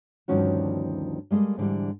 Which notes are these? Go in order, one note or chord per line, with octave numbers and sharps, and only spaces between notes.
D2 G2 D#3 F3 C#4 F#4
G3 G#3 A#3 A4 D#5
G#2 D3 E3 G3